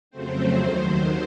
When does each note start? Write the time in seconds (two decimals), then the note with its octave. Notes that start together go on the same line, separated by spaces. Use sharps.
0.10 F2 C#3 F#3 A3 C4 C5
0.59 D#2 D#3 F#3 C5